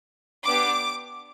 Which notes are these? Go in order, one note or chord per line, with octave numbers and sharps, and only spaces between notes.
B3 D4 G4 D6